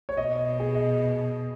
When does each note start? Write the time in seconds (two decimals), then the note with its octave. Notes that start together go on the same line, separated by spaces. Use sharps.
0.09 C#5
0.17 B2 D#5
0.60 G#4
0.74 D#5